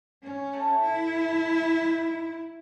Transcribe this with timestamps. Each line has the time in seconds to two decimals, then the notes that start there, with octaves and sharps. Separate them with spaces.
0.23 C#4
0.53 A3 A4
0.83 E4
1.84 D#4 A#4 C5